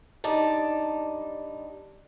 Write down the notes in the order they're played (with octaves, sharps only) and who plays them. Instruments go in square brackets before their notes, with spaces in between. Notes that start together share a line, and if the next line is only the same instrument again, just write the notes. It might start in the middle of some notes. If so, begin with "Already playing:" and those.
[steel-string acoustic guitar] G2 D#4 D5 A5